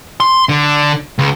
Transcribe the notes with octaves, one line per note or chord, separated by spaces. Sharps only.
C6
D3
C#2